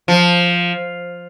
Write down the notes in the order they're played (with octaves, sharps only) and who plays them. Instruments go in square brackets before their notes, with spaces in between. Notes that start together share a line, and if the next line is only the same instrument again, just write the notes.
[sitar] F3